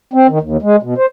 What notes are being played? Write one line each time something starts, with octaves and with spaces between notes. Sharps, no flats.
C4
D#3
D#2
G#3
B2
C5